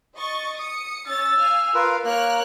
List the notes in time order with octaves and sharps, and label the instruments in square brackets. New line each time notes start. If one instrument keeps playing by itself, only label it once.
[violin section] D#5 C#6 A6
D#6 C#7
[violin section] C#4 C#5 A6 [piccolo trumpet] E6
[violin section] F5 G#5 F6
[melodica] F4 A#4 B4 [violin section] F5
[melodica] A#3 A#4 [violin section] C#5 F6 F#6